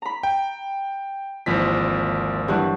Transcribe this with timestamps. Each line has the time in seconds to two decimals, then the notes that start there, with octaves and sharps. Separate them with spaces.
0.02 A#5 B5
0.23 G5
1.46 G#1 D#2 E3 F3 B6
2.48 G2 E3 F#3